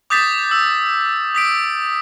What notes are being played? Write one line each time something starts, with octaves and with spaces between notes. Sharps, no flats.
D6 D#6 G6 A6 B6
E6
D#6 B6 D7